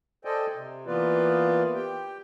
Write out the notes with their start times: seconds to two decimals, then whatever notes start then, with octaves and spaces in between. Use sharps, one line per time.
0.25 A4 C5 D5 D#5 G5 G#5
0.55 C3
0.87 E3 A#3 B3 F4 B4 D5
1.74 G4 G5